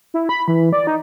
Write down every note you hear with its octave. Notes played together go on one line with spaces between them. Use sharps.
E4
B5
E3
D5
D#4